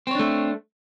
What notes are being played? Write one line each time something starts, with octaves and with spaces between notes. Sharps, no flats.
A3 C4 D4 C#5